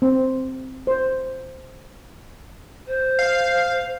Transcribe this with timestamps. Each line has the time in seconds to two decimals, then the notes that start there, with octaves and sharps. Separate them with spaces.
0.02 C4
0.87 C5
2.87 C5
3.19 F5